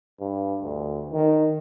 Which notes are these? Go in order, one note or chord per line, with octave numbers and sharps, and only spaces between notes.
G2
D2
D#3